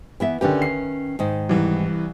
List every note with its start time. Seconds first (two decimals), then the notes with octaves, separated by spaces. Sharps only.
0.20 E3 B3 E5
0.41 D3 D#3 C#4 G4 B4
0.62 C7
1.19 G#2 D#3 D#4
1.49 C2 E3